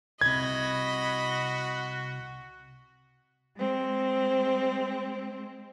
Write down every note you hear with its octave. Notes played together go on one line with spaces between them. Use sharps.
C2 C3 F#4 D#5 B5 G#6
G#3 C4